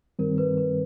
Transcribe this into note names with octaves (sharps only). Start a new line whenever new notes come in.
G2 D#3 G3 C4 A#4
B4
B4